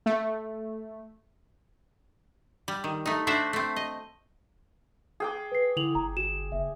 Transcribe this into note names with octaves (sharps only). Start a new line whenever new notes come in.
A3
G3
D#3
A3 D#4
A3 D4 F#4 C5 E5
A3 C4
D#5
G#4 G5 D6
B4 C7
D3 E4 F7 F#7
G1 A#5
F#4 E7
F#1 E5